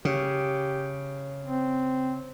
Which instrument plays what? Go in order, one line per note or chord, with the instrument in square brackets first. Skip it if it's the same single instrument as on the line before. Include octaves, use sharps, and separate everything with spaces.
[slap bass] C#3 [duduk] G4
[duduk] C4